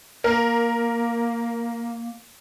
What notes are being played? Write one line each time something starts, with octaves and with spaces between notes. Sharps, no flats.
A#3 A#4